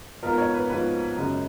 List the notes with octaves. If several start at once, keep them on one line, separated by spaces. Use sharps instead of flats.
G#2 F3 B3 F4 A#4
C#5
B4
G#2 F3 B3 F4 B4
F#2 C#3 G#3